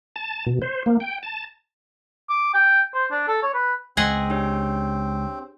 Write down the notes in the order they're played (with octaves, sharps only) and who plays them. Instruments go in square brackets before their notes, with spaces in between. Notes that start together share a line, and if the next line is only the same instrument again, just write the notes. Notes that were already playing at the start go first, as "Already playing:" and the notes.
[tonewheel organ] A5
B2
C5
A#3
G5
A5
[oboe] D6
G5
C5
D4
A4
C#5
B4
[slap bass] C#2 [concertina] C4 [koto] G#4 D#5 F#5
[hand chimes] D4 G4 C#5